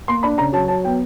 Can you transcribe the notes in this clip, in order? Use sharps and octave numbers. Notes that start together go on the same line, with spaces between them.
A#3 C6
D4 B5
C#3 A#5
F#3 A5
F#3 A5
B3 G5